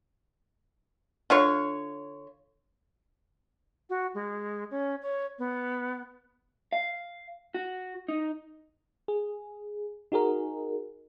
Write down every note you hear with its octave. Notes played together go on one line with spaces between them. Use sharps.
D3 F4 C#5
F#4
G#3
C#4
C#5
B3
F5
F#4
D#4
G#4
D#4 F#4 G#4 A#4